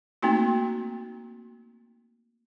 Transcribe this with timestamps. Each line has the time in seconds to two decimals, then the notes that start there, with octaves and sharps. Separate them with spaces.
0.22 A3 A#3 C4 D#4 F#4